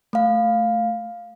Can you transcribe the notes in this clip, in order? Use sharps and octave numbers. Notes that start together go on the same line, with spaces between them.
A3 F5